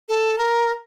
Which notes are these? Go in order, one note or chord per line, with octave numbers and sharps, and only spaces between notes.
A4
A#4